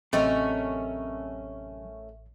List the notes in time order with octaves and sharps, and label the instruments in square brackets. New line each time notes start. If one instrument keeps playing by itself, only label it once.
[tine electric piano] A1 [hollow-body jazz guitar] F#2 C3 [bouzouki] A3 C#4 A#4 [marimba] D#5